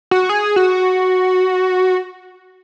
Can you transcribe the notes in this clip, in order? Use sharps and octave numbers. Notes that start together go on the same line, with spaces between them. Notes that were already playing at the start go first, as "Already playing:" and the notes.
F#4
G#4
F#4